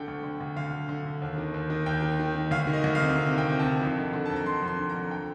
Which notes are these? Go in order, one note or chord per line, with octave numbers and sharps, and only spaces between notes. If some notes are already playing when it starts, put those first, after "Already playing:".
Already playing: D3 G5
D2
D3
D2
D3 F5
D3
D3
D3
D#2
D#3
D#2
D#3
D#2 G5
D#3
D#3
D#3
D2 F5
D#3
D#5
D2
F5
C3
C3
D#3
G5
C3
A5
D#3
F2
D3
D3
F2 A5
A#5
D3 C6
F2
C6
D3
A#5
D3
G5